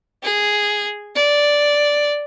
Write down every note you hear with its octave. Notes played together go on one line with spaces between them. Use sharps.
G#4
D5